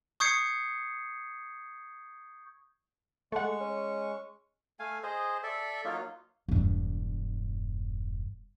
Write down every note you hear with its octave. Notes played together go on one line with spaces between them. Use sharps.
C#6 D#6 G6 G#6 C7 C#7
G#3 A3 F#5 C#6
C#4
A3 F5 G#5
G#4 C5 D#5
A4 D5 E5
F#3 A#3 D#4 F4
E1 G2